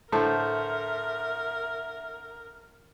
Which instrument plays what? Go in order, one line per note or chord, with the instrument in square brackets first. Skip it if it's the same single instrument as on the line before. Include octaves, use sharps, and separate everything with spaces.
[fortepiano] A2 D3 [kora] A4 C5 [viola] A#4 [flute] E5